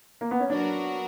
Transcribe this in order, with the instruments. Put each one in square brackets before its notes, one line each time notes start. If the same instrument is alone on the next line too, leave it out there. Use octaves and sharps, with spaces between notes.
[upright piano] A#3
B3
C#4
[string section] F#3 B3 F#4 A#4 [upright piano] D4